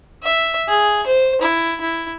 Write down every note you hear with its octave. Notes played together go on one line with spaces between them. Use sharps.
E5
G#4
C5
E4
E4